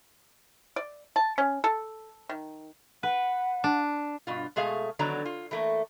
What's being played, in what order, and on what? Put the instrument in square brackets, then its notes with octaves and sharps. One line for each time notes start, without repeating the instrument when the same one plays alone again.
[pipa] D5
A5
C#4
A4
D#3
[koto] B4 [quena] F#5
[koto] D4
[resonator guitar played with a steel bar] G2 B2 F4
B2 G#3 A3 G#4 F5
D3 D#3 F#3 B3 D5 A#5
F4
E3 A3 A#3